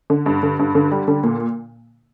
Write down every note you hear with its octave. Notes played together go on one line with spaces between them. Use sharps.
D3
G2
D3
G2
D3
G3
D3
A#2